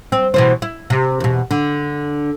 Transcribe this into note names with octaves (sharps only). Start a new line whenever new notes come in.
C4
B2 E3 C5
E4
C3
E2 B2
D3